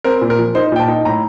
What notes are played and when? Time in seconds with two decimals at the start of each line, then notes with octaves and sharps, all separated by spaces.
0.04 C4 A#4
0.22 A#2
0.30 A#4
0.39 F3
0.55 D#4 C5
0.72 A#2 G5
0.80 A5
0.88 D#4
1.05 A2 A#5